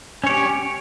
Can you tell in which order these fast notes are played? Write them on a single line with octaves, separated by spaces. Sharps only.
C#4 C#5 G4